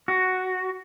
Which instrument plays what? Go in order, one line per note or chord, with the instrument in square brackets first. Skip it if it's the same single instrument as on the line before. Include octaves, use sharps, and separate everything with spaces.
[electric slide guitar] F#4